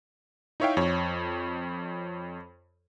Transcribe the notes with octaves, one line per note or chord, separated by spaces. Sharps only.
D#4 E4 C#5 E5 F5 G5
F2 C#5